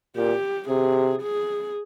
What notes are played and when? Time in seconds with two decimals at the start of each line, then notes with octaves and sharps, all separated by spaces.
0.17 A#2 G4
0.69 C3 G#4
1.22 G#4